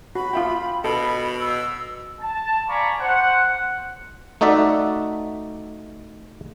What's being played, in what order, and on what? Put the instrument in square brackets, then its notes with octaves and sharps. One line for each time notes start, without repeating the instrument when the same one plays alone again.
[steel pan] F#4 [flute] B5
[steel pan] F4 E5 G5
[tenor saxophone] B2 [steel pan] A4 [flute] B5
[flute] E6
[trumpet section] A5
D5 F5 G#5 A#5 B5 C#6
C5 F#5
[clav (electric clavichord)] A3 D#4 F#4 D5 E5